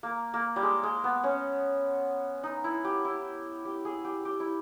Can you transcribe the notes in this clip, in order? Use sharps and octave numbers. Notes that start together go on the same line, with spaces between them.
A#3
A#3
G3
G#3
G#3
B3
C#4
D#4
E4
G4
E4
G4
G#4
G4
G4
E4